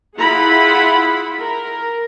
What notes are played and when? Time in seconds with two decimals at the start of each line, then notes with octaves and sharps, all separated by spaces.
0.17 E4 F4 G#4 F#5 B5
1.39 A#4